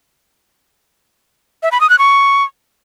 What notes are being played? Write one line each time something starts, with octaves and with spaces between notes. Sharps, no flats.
E5
B5
D#6
F#6
C#6